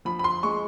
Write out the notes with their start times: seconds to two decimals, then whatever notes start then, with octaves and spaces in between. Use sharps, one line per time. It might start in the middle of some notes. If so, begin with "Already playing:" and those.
0.05 F3 B5
0.19 B5
0.24 C6
0.43 G#3 C#6